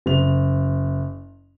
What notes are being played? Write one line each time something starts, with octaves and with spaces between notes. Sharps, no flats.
F#1 F7